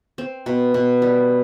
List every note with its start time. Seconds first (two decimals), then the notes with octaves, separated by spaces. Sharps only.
0.18 C4
0.46 B2
0.74 B2
1.02 G3